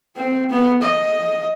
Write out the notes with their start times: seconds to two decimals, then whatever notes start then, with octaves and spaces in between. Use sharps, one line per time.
0.16 C4
0.50 B3
0.82 D#5